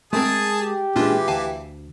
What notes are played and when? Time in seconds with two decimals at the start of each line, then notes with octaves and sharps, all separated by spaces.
0.13 G#3 A3 C4 G#4 A#4 A5 D#6
0.61 G4
0.96 A#2 E3 G#3 C#4 D4 F4
1.28 D2 F5 G#5 A5